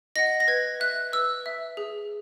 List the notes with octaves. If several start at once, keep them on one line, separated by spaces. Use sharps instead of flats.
D#5 F#5 A#6
A#6
B4 G#6
E5 F#6
B4 E6
E5
G#4